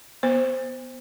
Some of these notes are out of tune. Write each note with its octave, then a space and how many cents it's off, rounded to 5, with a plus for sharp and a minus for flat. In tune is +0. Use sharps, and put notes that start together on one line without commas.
B3 +0 C5 +0